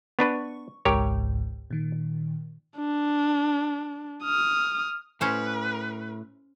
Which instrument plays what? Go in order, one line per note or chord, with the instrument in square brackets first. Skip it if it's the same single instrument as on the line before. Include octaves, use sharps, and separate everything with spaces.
[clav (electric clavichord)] B3 D4 B4 [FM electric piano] C#6
[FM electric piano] G#1 C#2 G#2 [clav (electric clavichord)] G4 A#4 C#5
[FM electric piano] A#2 D#3
[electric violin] D4
D#6 F6
[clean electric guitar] A2 [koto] C#4 C5 [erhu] B4